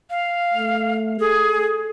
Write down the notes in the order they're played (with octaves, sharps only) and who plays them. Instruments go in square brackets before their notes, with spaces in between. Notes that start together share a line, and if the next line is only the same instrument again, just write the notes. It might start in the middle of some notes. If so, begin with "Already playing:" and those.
[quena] F5
[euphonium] A3
[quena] G#4 [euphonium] A4